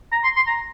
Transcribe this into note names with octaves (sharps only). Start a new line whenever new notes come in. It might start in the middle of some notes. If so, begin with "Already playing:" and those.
A#5
C6
C6
A#5